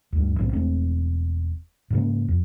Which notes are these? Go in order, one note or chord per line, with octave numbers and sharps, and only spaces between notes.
D2 G2
B1 A2 C4
E1 A3 C4
G#2 C#3 A#3
F2